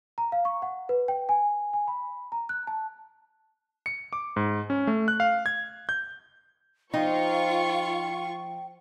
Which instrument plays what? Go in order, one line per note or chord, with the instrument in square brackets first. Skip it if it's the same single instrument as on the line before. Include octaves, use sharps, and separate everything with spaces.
[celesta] A#5
F5
C#6
F#5
B4
G5
G#5
G#5
B5
A#5
F#6
A5
[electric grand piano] C#7
D6
G#2
C#4
A3
F#6
F5
G#6
G6
[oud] F3 [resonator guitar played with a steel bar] D#4 [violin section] F4 C#6 [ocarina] G5